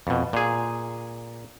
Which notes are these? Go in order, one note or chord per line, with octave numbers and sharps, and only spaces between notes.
F2 B2
A#2 G#4